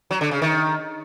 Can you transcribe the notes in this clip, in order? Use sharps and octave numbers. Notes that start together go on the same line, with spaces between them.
F#3
D3
C#3
D#3